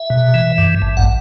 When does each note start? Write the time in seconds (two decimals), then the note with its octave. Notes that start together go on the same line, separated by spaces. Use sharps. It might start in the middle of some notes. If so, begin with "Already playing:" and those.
Already playing: E5
0.10 B2
0.34 E3
0.58 G2
0.82 A1
0.97 F#5